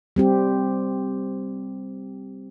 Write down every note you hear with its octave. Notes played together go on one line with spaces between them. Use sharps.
G3 C4 G4